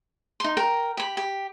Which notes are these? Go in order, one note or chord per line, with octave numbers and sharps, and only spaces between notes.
D#4 C6
A#4 G5
G4 B5
G4